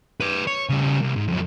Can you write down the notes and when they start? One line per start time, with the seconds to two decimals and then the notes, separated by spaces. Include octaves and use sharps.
0.20 B4 D5
0.47 C#5
0.69 C#3 G3
1.01 C2
1.16 G#2
1.28 F2 F#3